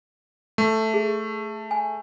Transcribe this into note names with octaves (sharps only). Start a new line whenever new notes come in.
A3
G#4
G#5